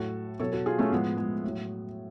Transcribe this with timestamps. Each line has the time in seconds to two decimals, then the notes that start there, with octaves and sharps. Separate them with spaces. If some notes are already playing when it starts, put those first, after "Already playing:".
Already playing: A2 F#3 F#4 A4
0.40 B2 F#3 A4 C#5
0.53 F#4 A4
0.66 F4 G#4
0.79 A3 C#4
0.92 A2 F3 G#3 B3
1.17 G#3
1.44 A2 F#3